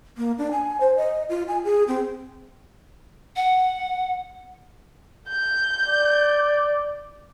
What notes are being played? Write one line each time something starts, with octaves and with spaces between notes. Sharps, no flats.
A#3
D4
G#5
C5
D#5
F4
G#5
G#4
C4
F#5
G6
D5